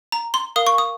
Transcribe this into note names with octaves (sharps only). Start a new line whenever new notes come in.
A#5
C6
A#4 F5 D#6
C#6
D#6